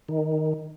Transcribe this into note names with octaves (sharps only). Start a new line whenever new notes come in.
D#3